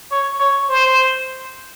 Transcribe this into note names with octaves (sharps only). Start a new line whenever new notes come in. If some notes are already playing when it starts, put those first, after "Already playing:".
C#5
C#5
C5